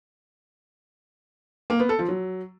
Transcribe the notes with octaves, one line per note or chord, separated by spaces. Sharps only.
A#3
B3
A4
F3
F#3